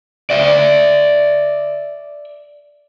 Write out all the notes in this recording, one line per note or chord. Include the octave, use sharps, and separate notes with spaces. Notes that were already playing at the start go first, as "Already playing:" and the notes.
D5 E5